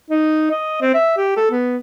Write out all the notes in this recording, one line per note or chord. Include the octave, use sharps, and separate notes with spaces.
D#4
D#5
C4
E5
G4
A4
B3